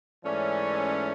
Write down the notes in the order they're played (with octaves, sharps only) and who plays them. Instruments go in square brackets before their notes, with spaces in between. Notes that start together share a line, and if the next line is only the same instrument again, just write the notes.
[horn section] G#2 E3 A3 C#4 [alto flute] D5